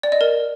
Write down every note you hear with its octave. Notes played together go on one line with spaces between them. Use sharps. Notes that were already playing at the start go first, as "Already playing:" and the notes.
D5
D#5
A#4